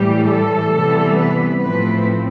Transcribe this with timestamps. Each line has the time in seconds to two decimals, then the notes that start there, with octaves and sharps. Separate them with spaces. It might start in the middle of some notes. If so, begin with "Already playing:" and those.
Already playing: A2 E3 G3 G4
0.29 A4
0.74 C3 E3 G3 B3
1.18 B4
1.62 A2 F3 A3 C4 B4